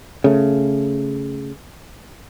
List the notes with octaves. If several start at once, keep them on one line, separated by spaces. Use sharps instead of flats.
C#3 A3